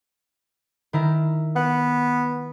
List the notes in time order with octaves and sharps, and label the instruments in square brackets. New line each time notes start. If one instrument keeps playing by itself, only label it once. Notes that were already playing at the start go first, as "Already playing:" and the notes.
[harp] D#3 E4 A#4
[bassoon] B3 [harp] F#5